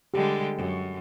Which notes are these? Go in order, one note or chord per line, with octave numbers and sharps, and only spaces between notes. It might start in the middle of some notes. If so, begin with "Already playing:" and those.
D3 G3 G#3 G4
F#2